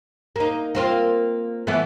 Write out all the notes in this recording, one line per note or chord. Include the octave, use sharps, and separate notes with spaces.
A#3 D#4
A#3 C4 F4
E3 A3 B3